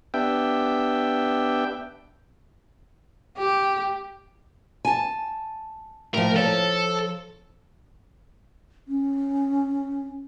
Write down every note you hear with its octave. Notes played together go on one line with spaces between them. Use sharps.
B3 D4 G4 E5 G5
G4
G#5 A5
A2 F3 A#4
F3 A4 C#5
C#4